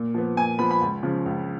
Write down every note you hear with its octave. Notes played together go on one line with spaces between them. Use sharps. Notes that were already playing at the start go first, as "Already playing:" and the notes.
Already playing: A#2
F3 B3
A#2 G#5
F3 B3 B5
B5
C#2
C#3 F3
C#2